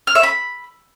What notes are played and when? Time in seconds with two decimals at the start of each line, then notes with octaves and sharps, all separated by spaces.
0.07 F6
0.15 E5
0.23 B5